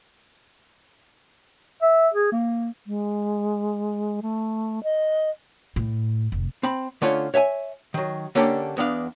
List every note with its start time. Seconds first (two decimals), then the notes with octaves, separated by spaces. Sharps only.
1.82 E5
2.14 G#4
2.31 A#3
2.87 G#3
4.22 A3
4.83 D#5
5.76 A2
6.32 F1
6.63 C4 B5
7.02 D3 A3 C#4 F4
7.34 C#5 E5 G5 G#5
7.94 D#3 F#3
8.35 D3 A#3 C#4 D4 G4 D5
8.77 E2 B3 D4 F5